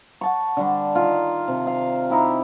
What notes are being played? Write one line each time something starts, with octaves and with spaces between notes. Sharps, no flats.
F#5 A5 C#6
D3 G3 D4
D#3 F4
C3
F5
D#4 E4 G4